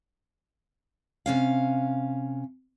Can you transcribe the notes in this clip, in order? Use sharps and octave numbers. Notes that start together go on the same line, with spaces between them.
C3 C#4 F5